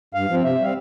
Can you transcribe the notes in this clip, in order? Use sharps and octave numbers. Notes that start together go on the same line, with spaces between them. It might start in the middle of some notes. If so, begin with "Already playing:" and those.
G2 F5
F3 C4
C3 E5
G3 C4 F5